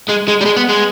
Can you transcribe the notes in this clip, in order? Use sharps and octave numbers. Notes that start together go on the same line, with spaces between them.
G#3
G#3
G3
G#3
B3
G#3